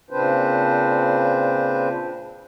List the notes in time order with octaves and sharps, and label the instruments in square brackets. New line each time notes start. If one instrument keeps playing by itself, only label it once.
[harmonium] A#2 C#3 C4 D4 B4 C5